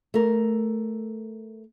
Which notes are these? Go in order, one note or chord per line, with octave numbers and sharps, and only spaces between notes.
A3 A#4